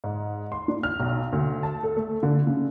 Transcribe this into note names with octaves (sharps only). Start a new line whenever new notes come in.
G#2
C6
D4
F6
B1
D2
A5
A4
A3
D3
C#3